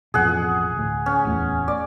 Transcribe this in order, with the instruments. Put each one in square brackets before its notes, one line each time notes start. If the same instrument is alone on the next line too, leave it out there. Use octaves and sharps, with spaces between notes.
[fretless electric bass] A1 F2 B2 [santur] G#4 F#5
[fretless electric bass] D2 A2
[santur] C#4
[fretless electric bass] D1 E2 A3
[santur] D5